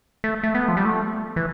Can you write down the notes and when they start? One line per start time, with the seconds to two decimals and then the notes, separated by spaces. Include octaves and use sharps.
0.24 A3
0.43 A3
0.55 B3
0.68 F3
0.77 G3
0.85 A3
1.36 E3